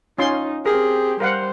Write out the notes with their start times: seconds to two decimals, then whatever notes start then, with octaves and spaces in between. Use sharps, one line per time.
0.18 C#4 D#4 F4 C6
0.66 C4 G4 G#4 A#4
1.20 G3 A#4 C5 F5 F#5